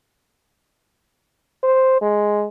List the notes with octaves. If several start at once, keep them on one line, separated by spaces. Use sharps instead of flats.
C5
G#3